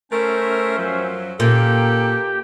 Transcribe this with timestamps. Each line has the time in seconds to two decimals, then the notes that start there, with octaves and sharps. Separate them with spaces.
0.11 A3 C#4 A#4 C5 E5
0.77 F#2 F3 F#3
1.40 A#2 C#4 G4 A4 A#4 G5